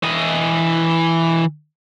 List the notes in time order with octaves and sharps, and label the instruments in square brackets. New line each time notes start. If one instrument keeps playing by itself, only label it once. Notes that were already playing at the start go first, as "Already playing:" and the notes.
[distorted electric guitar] E3 D#5